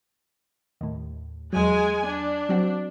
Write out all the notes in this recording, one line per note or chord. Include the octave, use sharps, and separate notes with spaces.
D#2 A2
E2 F#3 G#3 G#5
D4
F#3 C4 F#4